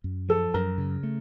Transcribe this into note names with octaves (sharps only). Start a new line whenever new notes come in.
F#2
F3 A4
F#2 A#4
C#3
A3